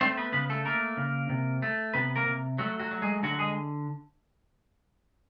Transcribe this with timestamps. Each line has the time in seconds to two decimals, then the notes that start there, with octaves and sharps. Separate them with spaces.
0.01 A3 C4 C5
0.17 B3 B4
0.32 C#3 B3 B4
0.50 A3 A4
0.65 A3 A#3 A#4
0.97 C#3
1.29 C3
1.62 A3
1.94 C3 B3 B4
2.16 A#3 A#4
2.26 C3
2.58 F#3 A3 F#4
2.80 F#3 F#4
2.91 F#3
3.02 G#3 G#4
3.23 D3 F#3 F#4
3.39 G#3 G#4